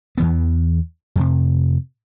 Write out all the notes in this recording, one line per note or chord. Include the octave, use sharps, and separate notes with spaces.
E2 E3 B3
F2 C3